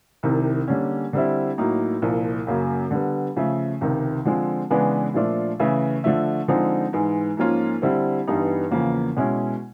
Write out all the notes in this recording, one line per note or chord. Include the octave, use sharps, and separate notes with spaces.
C2 C3 D#3
D3 G3 A#3 C#4
D3 G3 C4 E4
A2 F#3 A#3 D#4
C2 A#2 F3
F#2 C#3 F#3 A#3
D3 G3 B3
C#3 F3 A3
C#2 C3 D#3
D3 F3 G#3 C4
C#3 E3 G#3 B3 D4
A#2 F3 A3 D4 F4
C#3 E3 A3
D3 F3 A3
D3 F3 G#3 C4 D#4
G#2 E3 G#3
G#2 F3 A#3 C#4 F4
D3 G3 C4 E4
G2 E3 G3 B3 D#4
E2 C#3 F3 A#3
B2 G#3 C#4 E4